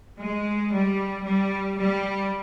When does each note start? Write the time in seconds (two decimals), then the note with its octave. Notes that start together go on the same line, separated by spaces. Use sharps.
0.20 G#3
0.73 G3
1.26 G3
1.80 G3